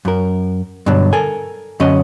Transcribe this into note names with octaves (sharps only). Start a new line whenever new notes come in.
F#2 A#4
G2 B2 D3 F#3
A4 A#4 G#5
F#2 D3 C#4 D#5